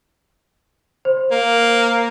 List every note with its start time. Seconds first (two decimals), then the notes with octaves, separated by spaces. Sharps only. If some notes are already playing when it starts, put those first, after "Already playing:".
1.05 C5
1.31 A#3